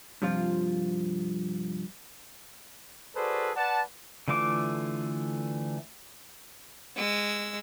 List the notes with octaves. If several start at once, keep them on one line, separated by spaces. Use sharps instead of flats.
G2 C3 F3 F4
F#4 G#4 A4 B4 C5 D5
B4 D5 F#5 A5
D3 E3 A3 F4 D6
G#3 E6